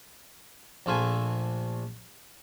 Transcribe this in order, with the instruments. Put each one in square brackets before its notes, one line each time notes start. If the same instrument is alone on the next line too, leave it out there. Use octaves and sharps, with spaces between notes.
[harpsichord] A#1 A3 F4 E5 G#5